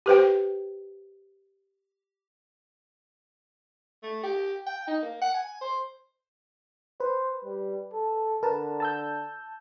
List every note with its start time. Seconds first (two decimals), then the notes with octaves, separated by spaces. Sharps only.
0.06 G4 B4 C5 G5
4.03 A3
4.23 G4
4.66 G5
4.87 D#4
5.02 A#3
5.22 F#5
5.34 G#5
5.61 C5
7.00 B4 C5
7.45 G3
7.94 A4
8.43 D3 A#4 B4 A5
8.80 A5 E6 G6